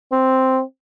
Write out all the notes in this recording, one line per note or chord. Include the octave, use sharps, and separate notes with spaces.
C4